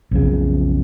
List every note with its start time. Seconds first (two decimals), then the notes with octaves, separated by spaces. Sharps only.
0.11 B1 F2 C#3